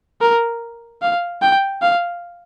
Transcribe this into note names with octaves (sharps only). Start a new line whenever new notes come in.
A#4
F5
G5
F5